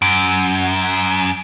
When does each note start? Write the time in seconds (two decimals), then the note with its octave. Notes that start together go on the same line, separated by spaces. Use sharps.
0.02 F#2 D7